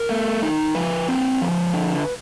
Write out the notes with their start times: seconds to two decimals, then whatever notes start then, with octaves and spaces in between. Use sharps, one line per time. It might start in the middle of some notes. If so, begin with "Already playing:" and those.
Already playing: A#4
0.09 A3
0.42 D#4
0.75 F3 B4
1.09 C4
1.41 F3
1.73 D3